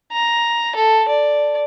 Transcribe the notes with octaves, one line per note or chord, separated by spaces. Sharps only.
A#5
A4
D5